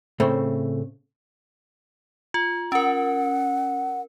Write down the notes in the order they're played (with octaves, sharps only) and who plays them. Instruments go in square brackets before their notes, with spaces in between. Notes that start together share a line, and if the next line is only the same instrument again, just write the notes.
[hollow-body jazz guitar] A2 C#3 A3 C4
[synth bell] F4
[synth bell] C#4 A#4 [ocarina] F#5